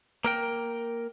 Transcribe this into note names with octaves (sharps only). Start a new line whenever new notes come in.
A#3 A#4 G5